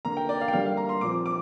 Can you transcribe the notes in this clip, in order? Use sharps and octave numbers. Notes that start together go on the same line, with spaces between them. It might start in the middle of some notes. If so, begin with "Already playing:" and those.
D3 A#3 A#5
G5
D5
F5
G5
D3 G3 A#3 F5
F5
A#5
C6
A#2 F3 C4 D6
D6